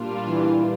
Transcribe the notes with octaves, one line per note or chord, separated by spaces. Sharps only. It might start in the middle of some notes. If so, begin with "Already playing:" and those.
Already playing: A#2 G3 A#3 D4 F4
E3